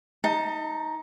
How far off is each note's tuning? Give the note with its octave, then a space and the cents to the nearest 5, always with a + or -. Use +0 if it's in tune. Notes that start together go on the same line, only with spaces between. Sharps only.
D#4 +10 A5 +40